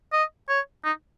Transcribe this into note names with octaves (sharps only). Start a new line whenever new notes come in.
D#5
C#5
D#4